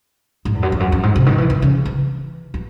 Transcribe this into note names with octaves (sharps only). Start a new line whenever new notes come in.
G#2
E2
F#2
E2
F#2
F#2
G#2
C3
D#3
E3
D#3
C#3
E3
E3